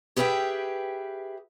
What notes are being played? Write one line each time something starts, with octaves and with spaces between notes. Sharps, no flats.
G4 G#4 B4 D#5 E5 G5